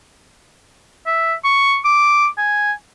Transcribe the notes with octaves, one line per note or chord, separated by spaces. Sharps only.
E5
C#6
D6
G#5